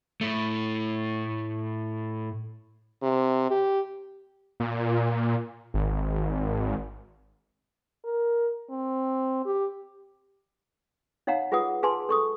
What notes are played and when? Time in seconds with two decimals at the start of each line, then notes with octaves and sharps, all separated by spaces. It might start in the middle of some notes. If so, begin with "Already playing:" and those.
0.21 A2 A3
3.03 C3
3.51 G4
4.60 A#2
5.74 G#1
8.05 A#4
8.70 C4
9.45 G4
11.27 D#4 C#5 F5 F#5 A#5
11.52 F4 G#4 B4 F#5 D#6
11.83 G#4 B4 G#5 A5 C6
12.09 A4 C#6 D#6